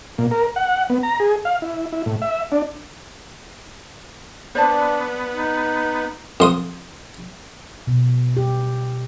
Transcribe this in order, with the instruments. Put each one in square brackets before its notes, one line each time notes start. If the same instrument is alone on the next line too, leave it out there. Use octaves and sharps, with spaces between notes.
[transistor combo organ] A#2
A#4
F#5
B3
A#5
G#4
F5
E4
E4
A2
E5
D4
[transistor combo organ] B3 [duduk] D4 [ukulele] C5 D5 A5
[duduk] D#4
[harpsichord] F2 C6 D#6
[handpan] B2
G4